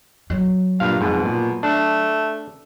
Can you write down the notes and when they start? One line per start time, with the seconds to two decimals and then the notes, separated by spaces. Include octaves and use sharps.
0.30 F#3
0.80 G2 A#2 F5
1.01 F2 G#2 B2
1.25 A#2
1.63 A3 D4